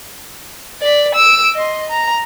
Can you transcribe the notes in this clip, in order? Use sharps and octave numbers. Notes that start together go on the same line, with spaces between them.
D5 B6
E6 D7
D#5 C6
A#5